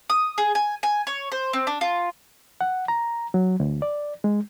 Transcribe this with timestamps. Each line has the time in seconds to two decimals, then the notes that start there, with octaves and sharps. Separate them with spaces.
0.10 D#6
0.38 G#4
0.55 G#5
0.83 G#5
1.07 C#5
1.32 C5
1.53 C4
1.67 D4
1.81 F4
2.61 F#5
2.88 A#5
3.34 F#3
3.60 D2
3.82 D5
4.24 G#3